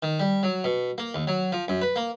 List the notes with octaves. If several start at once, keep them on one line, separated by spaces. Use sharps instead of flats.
D#3
G3
F#3
B2
A#3
D#2
F#3
F3
F#2
B4
A#3